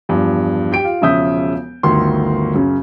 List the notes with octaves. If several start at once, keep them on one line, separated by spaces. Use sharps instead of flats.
E2 G2 F3
G4 G5 D7
F4
E1 C#3 F3 E5 D#6 G6
G1 D2 D#3 C6
F#2 C#3